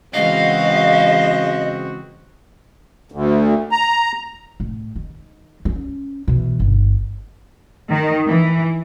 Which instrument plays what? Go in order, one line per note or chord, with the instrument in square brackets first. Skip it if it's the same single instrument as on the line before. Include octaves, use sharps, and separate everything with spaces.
[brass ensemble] C#3 C4 F#4 [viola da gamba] E3 G#3 [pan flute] D#5 [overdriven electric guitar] F5
[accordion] D2
A#5
[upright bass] A2
D#3
C#4
B2 E3
G1
[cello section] D#3
E3